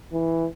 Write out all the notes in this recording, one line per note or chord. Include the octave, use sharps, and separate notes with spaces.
E3